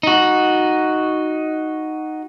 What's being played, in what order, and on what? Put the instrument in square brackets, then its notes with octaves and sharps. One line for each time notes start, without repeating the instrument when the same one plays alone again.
[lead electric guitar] D#4 F#4